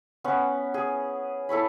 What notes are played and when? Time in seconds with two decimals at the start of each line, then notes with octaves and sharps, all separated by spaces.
0.24 B3 C#4 C#6
0.74 G#4
1.49 E4 A4 C#5 B5